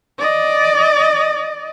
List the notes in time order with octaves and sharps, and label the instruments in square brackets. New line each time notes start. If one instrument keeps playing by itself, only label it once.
[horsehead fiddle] D5 D#5